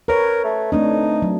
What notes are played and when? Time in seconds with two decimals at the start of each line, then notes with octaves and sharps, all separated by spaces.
0.08 A#4 B4 C#5
0.44 A3
0.72 A3 C4 D4 D#4
1.22 F#3